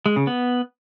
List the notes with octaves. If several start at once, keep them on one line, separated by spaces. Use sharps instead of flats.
G#3
C#3
B3